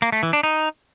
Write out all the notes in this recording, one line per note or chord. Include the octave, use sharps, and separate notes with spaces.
A#3
A3
E3
D4
D#4